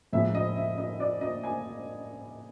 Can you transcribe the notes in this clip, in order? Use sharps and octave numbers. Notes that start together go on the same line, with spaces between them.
A2 F3 G#3 E5
D#5
E5
D#5
D5
D#5
G#5